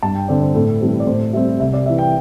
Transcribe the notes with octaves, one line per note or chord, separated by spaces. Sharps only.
G2 A5
G5
D3 C4 D5
C5
A2 A4
E3 G3 C4 A4
D5
A2 C5
G3 C4 E5
C2 E5
D5
C3 E3 E5
G5